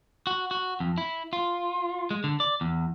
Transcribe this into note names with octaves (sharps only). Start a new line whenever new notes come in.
F#4
F#4
F2
E4
F4
G#3
D3
D5
E2